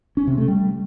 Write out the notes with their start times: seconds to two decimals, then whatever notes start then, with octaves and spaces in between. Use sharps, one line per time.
0.17 C#4
0.27 C3
0.38 A3
0.48 G3